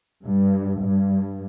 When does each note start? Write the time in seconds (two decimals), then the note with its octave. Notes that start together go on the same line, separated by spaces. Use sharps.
0.24 G2
0.81 G2